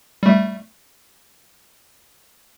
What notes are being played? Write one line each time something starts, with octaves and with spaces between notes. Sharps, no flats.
G3 A3